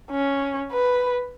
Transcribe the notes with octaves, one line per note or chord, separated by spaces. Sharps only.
C#4
B4